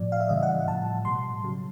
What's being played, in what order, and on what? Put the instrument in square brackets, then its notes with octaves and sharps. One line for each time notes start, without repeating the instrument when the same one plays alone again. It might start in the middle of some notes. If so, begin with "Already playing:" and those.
Already playing: [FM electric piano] A2 F3 D5
F5
E5
C#3 E3 G3 D#5
F#5
A2 F3 A5
B2 G3 C6
C#3 F#3